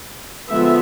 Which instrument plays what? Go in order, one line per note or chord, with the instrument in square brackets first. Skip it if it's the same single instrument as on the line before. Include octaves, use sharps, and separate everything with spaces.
[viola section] D3 F3 G#3 B3 E5